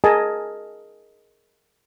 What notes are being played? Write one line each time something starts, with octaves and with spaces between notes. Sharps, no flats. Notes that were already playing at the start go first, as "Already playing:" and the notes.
G#4 A#4 D#5 G#5 A5